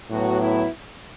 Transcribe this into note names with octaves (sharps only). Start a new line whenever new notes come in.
A2 F#3 B3 F#4
E4